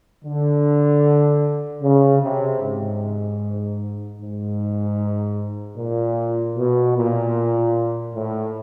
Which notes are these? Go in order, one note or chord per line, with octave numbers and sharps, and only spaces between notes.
D3
C#3
C3
G#2
G#2
A#2
B2
A#2
A2